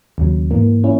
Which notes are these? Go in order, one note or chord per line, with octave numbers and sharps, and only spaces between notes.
D#2 C#3 F#3
G#2 E3 A#3
A#3 C#4 E4